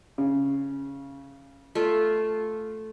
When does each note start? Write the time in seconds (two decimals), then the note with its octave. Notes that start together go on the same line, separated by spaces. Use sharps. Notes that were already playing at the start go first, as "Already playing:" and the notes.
0.18 C#3
1.75 A3 F4 E5